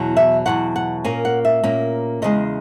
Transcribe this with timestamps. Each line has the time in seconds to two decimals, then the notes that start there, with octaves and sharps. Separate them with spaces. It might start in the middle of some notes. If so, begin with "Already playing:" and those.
Already playing: E2 B2 F#3
0.17 E5
0.46 E2 B2 F#3 F#5
0.76 F#5
1.04 A#2 A#3 C#4 G#5
1.25 F#5
1.45 E5
1.63 A#2 A#3 C#4
2.22 E2 C#3 G#3 D#5